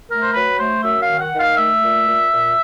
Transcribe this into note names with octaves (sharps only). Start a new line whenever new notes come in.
A3 A#4
C5
F#3 B4
A3 C5
F#2 E5
F5
D#3
F#5
D#3
F5
A3 E5
A#2
A#2
A#2